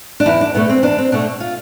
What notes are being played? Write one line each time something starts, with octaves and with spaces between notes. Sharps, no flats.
D4
E2 E4
D4
B2 A3 B3
C4
E2 D4
C4
B2 A3 D4
F4